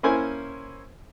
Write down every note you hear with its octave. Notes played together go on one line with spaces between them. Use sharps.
A#3 C#4 E4 C5 G#5